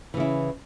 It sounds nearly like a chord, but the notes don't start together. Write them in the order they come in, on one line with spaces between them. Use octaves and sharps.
E3 C#3 E4